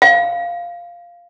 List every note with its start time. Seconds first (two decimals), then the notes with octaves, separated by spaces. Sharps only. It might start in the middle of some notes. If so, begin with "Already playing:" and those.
0.02 F5